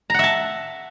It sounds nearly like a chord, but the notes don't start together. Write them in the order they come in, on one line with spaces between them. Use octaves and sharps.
A#5 F#5 E5 A5